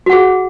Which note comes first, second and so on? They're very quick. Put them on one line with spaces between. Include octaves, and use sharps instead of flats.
F#4 F#5 G#4